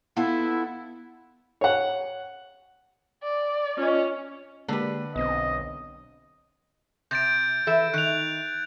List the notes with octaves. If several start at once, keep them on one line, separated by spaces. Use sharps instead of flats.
B3 E4 F4 A4
C#5 F#5
D5
C#4 F4 D#5
D3 G#3 A#3 G4 B4
B1 B3 C4 D#5
C3 G6 A6 D7
E3 A4 E5
D#3 F#6 F7